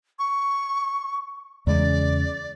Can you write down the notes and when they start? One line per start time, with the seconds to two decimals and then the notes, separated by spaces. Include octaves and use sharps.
0.19 C#6
1.67 E2 C#3 G#3 D5